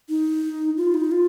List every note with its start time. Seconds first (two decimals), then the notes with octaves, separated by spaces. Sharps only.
0.10 D#4
0.77 F4
0.94 D#4
1.12 F4